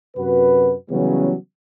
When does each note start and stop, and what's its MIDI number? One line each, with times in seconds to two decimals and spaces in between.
0.17 0.75 42
0.17 0.75 48
0.17 0.75 66
0.17 0.75 71
0.90 1.35 49
0.90 1.35 52
0.90 1.35 54
0.90 1.35 55
0.90 1.35 59
0.90 1.35 61